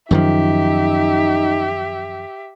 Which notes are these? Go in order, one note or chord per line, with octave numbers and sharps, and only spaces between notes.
F#2 D#3 F3 D#4 G4 E5